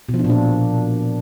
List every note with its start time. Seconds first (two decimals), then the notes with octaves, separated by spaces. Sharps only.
0.09 B2
0.14 F3
0.19 D4
0.24 A#2
0.30 D4